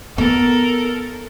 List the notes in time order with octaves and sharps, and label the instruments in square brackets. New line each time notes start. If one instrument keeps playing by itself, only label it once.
[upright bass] B3 [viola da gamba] A4 A#4